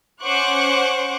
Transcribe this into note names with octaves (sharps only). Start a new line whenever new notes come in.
C#4 C5 F#5 C#6 D6 F#6